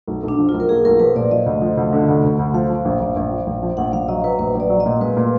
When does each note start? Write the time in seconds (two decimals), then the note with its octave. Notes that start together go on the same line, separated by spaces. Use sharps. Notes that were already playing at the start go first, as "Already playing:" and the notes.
0.08 B1
0.23 B1
0.28 D4
0.39 F3
0.49 B1 F4
0.60 A#4
0.69 A#3 G#4
0.85 B1 A#4
1.00 F3 B4
1.15 A#2 D5
1.31 F3 D#5
1.46 D2
1.62 F3
1.77 D2
1.93 D3
2.08 D2
2.24 D2
2.39 D2
2.54 F3 F5
2.70 F3
2.85 A#1
3.00 A#1
3.16 A#1
3.31 F3
3.47 A#1
3.63 F3
3.77 A#1 F#5
3.93 A#1 F5
4.08 F#3 D#5
4.24 F#3 B4
4.39 A#1 B4
4.55 A#1
4.60 D5
4.70 F#3
4.80 D#5
4.86 A#2
5.00 G#3 B4
5.17 A#2